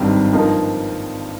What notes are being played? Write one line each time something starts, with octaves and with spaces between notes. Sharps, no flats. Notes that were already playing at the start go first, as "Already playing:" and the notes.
Already playing: G#1 G2 G3 C4 D#4
G2 F3 A#3 D#4